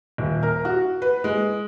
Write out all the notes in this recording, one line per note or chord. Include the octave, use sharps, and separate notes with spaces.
D#1
A#4
F#4
B4
G#3